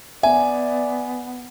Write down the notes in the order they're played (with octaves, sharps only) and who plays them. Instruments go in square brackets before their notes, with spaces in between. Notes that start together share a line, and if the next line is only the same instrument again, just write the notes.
[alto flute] B3 [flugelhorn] D5 [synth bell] E5 [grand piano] G#5